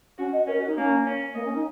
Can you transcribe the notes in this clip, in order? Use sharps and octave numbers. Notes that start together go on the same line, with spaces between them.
C#4 F#4
D#5
C#4 A#4
F#4
D#4
A#3 C#4
C#4
A#3 D#5
C#4
D#4